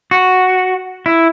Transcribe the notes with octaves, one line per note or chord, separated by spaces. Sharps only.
F#4
E4